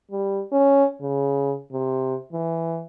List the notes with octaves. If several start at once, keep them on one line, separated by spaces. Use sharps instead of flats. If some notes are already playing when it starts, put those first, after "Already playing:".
G3
C#4
C#3
C3
E3